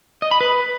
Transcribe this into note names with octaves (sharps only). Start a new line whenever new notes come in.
D#5
B5
B4